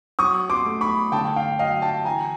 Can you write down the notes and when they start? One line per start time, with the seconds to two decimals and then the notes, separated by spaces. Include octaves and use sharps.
0.19 F#3 C#6 D#6
0.50 C6 D6
0.65 A3
0.81 B5 C#6
1.12 D3 G5 A5
1.36 F5 G5
1.59 F#3 D#5 F5
1.82 G5 A5
2.05 E3 G#5 A#5